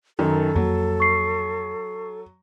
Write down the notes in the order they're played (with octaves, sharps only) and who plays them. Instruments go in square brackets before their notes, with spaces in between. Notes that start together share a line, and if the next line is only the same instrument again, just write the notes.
[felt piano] F#2 D#3 [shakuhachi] A4
[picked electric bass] F2 A#3 [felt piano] F#3
[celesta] C#6 C7